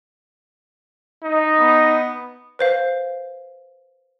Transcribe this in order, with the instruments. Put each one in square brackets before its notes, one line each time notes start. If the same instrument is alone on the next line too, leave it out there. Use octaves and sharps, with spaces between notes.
[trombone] D#4
[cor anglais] B3
[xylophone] B4 C5 F5